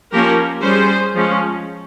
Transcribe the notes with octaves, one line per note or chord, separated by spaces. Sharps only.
F3 A#3 C#4 G4 A#4
G3 C#4 G#4 C5
F3 G#3 C#4